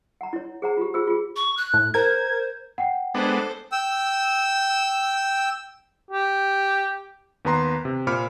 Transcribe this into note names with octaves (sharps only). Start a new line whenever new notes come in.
F#5 A#5
E4 C#5
G#4 C5 F#5 A#5
F4 G4
F4 G#4 C5 E6
F4 G#4
C#6
F#6
A2
A#4 C5 G#6
F#5 G5 C7
G#3 B3 D4 A4 C5
G5 E6
G4
D#2 B3 B4 A#5 C6
C3
A#2 C5 B5 D6 F6 C#7